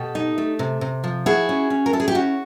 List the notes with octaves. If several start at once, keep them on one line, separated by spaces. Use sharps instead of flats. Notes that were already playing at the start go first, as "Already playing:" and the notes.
Already playing: B2 G4 A4
D#4
A3
C3
C3
F3
E4 F#4 G#4
C#4
C#4
A#4
E4 A4
G#4
G4
C#4 F#4